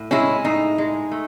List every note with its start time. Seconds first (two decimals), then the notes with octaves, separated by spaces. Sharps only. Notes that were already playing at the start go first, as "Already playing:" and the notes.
Already playing: A2
0.11 G#3 C#4 E4
0.45 A2 D#4
0.78 G#3
1.11 A3